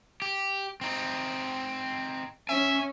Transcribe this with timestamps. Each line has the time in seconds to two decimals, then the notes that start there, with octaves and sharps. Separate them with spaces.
0.22 G4
0.81 C4 D#4
2.49 C#4 E5 G#5